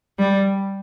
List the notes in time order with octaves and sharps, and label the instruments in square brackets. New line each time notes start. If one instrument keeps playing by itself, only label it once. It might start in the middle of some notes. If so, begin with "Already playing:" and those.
[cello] G3